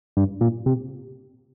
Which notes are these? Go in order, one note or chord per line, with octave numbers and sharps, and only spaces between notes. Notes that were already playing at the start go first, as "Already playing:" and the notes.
G2
A#2
C3